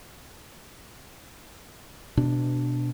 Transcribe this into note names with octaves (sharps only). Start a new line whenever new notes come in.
B2 D4